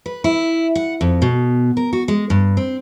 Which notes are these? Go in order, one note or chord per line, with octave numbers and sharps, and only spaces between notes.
B4
E4
F#5
F2
B2
A#4
F#4
G#3
G2
C4